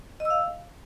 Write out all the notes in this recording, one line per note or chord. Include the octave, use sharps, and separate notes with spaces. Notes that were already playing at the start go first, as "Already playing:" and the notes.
D#5
E6
F5